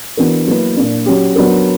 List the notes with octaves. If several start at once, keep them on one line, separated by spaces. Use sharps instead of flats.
E3 B3 D4 F#4 A#4
F#3 A#3 E4 B4
A#2 A#3 D4
F#3 C#4 G4
F#3 B3 D4 A#4